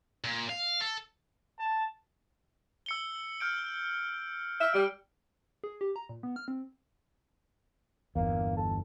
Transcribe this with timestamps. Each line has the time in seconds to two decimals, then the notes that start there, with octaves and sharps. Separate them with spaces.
0.24 A#2
0.49 F5
0.81 A4
1.59 A5
2.86 E6 C#7 G7
3.40 F6 G6 D7
4.61 E5 E6 F6
4.74 G3 D7
5.64 G#4
5.81 G4
5.96 A#5
6.09 A#2
6.23 B3
6.36 F6
6.48 C4
8.16 G1 E2 A#3
8.57 A4